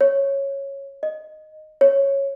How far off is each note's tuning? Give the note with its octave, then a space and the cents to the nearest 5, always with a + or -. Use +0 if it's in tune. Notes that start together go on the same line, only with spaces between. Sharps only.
C#5 -10
D#5 -10
C#5 -10